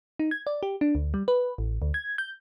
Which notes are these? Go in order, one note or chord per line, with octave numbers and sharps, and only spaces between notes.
D#4
G#6
D5
G4
D4
D2
G3
B4
A1
D2
G#6
G6